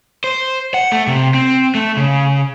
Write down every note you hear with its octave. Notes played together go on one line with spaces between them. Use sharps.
C5
F#5
A3
C3
C4
A3
C#3